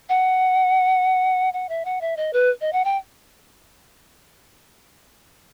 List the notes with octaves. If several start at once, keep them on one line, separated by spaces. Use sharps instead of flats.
F#5
F#5
E5
F#5
E5
D#5
B4
D#5
F#5
G5